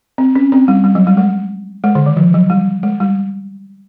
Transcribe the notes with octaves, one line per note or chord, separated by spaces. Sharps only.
C4
C#4
C4
G3
G3
F#3
G3
G#3
G#3
D3
D#3
F3
F#3
G3
G#3
G3